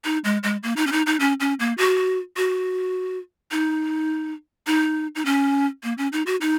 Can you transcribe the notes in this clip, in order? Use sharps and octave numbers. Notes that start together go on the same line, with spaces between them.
D#4
G#3
G#3
A#3
D#4
C#4
D#4
D#4
C#4
C#4
A#3
F#4
F#4
D#4
D#4
D#4
C#4
A#3
C#4
D#4
F#4
D#4